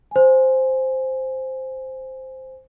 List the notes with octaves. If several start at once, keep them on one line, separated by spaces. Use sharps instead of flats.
C5 G#5